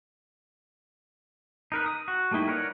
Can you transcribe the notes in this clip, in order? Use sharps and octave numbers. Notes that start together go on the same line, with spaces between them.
D#4 A#4 B4
D#6
F#4
G3 A3 A#3 D#4 E4
A#4 B4 C#5 D5 F#5